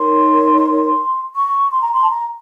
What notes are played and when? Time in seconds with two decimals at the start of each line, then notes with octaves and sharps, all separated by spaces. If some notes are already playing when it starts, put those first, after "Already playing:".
Already playing: D#4 A#4 C#5 C6
1.34 C#6
1.72 C6
1.82 A#5
1.92 C6
2.01 A5
2.09 A#5